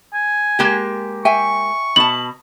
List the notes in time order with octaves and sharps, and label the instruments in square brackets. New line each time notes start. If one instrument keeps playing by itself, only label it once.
[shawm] G#5
[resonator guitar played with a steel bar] G#3 A#3 G4
[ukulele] E5 G5 G#5 [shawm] C#6
[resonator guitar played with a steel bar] B2 A5 [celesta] F#7